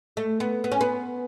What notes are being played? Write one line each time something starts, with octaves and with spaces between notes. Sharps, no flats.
A3
B3
B3
C#4
B3